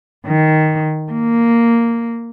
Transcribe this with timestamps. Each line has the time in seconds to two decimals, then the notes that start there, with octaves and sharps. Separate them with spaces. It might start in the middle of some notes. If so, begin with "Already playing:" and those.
0.26 D#3
1.12 A#3